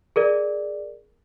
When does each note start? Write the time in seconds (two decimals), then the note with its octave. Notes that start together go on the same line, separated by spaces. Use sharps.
0.16 G#4 A#4 D5